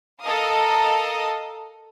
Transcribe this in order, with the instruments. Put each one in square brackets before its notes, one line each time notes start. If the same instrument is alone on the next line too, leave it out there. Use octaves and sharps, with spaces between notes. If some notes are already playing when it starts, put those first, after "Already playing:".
[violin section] A4 A#4 D#5 F5 D#6